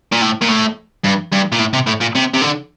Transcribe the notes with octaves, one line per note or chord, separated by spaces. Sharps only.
A#2
A2
A#2
A2
G2
G2
A#2
A2
C3
A2
A#2
C3
C3
D3